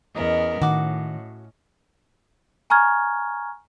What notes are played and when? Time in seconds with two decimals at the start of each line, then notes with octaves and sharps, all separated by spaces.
0.15 E2 B3 C#4 A#4 D#5
0.62 A2 D#3 F#4 D6
2.70 G#5 A#5 C#6 F6 G#6